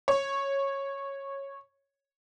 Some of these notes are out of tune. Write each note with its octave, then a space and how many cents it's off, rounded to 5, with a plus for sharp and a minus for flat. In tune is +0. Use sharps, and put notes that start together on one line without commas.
C#5 -10